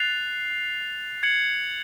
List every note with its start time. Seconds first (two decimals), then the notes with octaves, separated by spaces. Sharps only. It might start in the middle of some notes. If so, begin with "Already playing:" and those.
Already playing: F#6 A6 C7 F7
1.23 G#6 C#7 F#7